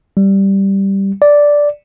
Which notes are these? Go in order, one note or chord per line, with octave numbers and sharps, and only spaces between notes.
G3
D5